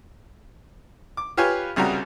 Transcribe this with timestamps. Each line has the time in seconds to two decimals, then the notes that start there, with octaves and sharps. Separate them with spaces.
1.17 D6
1.37 F4 G4 B4 C#5 F5 G#5
1.76 C2 C#3 G3 F#4 A#5